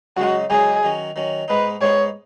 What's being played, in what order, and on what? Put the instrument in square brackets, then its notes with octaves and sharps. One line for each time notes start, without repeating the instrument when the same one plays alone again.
[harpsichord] F#2 C#3 G#3 D#4 [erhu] F#4
[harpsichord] F#2 C#3 G#3 D#4 [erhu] G#4
[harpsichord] D#3 F#3 C#4
D#3 F#3 C#4
[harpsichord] G#2 G#3 B3 D#4 [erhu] B4
[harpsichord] G#2 G#3 B3 D#4 [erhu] C#5